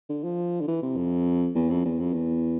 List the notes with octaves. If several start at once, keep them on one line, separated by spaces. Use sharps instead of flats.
D3
F3
D3
E3
C3
F2
E2
F2
E2
F2
E2